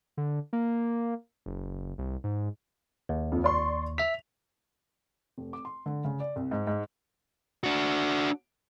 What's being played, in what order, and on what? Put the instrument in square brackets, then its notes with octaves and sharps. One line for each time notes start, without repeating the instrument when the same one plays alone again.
[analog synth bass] D3
A#3
F#1
C2
G#2
[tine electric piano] D#2
[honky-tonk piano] F2
D5 C6 C#6
[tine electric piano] E5 B6 [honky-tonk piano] F7
[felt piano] F1
D6
C6
D3
C#3
D5
C2
G#2
G#2
[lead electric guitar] D4 F#4